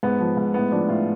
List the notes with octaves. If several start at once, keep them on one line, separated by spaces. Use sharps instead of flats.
G#2 B3
F3
G#2
A2 B3
F3 D4
A2 F4